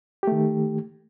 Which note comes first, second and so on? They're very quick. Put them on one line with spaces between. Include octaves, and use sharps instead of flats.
G4 A3 D#3